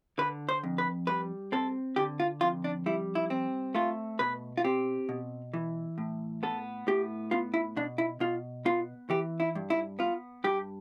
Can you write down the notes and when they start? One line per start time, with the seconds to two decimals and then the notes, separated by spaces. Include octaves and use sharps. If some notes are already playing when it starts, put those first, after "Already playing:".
0.18 D3 B4
0.49 C5
0.64 F2
0.78 B4
1.07 G3 B4
1.52 C4 A4
1.96 D3 G4
2.20 F4
2.41 F2 F4
2.64 D4
2.86 G3 E4
3.15 E4
3.30 C4
3.75 A3 F4
4.19 B2 B4
4.57 F4
4.64 C4 G4
5.09 B2
5.53 E3
5.98 A2
6.43 B3 A4
6.87 A2 G4
7.31 B3 F4
7.54 E4
7.76 B2 D4
7.98 E4
8.20 B2 F4
8.65 B3 F4
9.10 E3 G4
9.40 E4
9.55 G2
9.70 E4
9.99 B3 F4
10.44 G2 G4